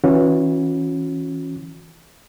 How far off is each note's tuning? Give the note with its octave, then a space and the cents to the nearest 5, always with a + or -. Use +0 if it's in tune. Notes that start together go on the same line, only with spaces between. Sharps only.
E3 -20 C#4 -15 F#4 -40